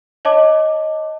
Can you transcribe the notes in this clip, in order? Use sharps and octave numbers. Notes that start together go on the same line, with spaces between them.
C#5 D#5 A5 D6